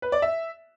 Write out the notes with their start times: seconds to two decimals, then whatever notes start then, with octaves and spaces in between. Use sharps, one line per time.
0.02 B4
0.12 D5
0.22 E5